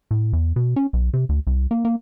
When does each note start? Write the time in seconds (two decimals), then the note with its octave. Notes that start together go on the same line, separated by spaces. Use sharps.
0.11 A2
0.33 E2
0.56 B2
0.76 C#4
0.93 B1
1.13 C3
1.29 D2
1.47 C2
1.71 A#3
1.85 A#3